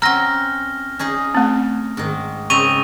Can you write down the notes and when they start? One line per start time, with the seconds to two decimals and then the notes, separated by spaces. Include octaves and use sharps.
0.02 C4 C#4 F#5 A#5 F6 A#6 G7
0.99 C#4 D#4 G#4
1.35 A3 C4
1.97 G#2 D#3
2.50 C#3 C4 D#4 C#6 D#7 F7